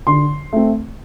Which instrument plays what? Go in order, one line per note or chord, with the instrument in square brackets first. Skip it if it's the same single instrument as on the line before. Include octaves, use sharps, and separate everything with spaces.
[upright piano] D3 C6
A3 C4